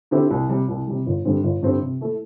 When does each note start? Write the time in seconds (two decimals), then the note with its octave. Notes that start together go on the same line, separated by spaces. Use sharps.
0.11 D3 C4 E4 G4
0.31 C2
0.49 C3 G3
0.68 C2
0.87 C3 G3
1.06 G1
1.25 G2 D3 G3 C4
1.44 G1
1.63 G2 D3 G3 C4
1.82 C3
2.01 A3 E4 A4